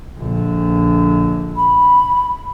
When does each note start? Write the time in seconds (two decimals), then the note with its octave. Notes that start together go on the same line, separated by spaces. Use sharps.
0.18 A#1 D3
1.56 B5